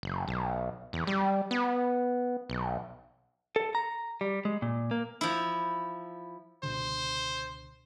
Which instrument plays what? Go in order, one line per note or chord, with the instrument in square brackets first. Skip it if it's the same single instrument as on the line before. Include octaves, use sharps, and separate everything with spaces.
[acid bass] F#1
B1
E2
G3
B3
B1
[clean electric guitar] A4
A#5
G3
G#3
A#2
A#3
[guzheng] F3 E4
[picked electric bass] C#2 B2 D3 [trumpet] C5